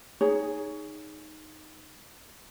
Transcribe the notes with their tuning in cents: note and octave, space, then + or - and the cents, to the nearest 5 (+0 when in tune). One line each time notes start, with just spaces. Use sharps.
D#4 +0 G#4 +0 C#5 +20